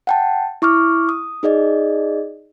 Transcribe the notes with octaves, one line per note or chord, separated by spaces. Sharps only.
F#5 G5 A5
E4 C#6 D6 F6
D#6
D#4 G#4 D5 D#5